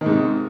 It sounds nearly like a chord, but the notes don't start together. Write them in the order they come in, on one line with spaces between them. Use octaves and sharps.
D#3 G#2 C3